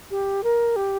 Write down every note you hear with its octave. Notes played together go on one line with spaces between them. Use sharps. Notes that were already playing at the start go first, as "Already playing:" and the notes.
G4
A#4
G4